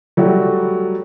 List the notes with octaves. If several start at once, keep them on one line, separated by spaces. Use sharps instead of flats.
F#3 G3 A3 F#4